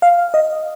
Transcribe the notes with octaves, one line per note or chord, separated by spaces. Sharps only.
F5
D#5